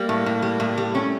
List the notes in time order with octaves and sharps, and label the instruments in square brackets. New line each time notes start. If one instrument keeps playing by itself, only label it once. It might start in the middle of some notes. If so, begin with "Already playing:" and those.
Already playing: [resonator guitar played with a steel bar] G3 [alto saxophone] A#3
[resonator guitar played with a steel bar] A2
A2
G3
A2
G3
[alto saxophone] A3 [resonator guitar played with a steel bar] C#4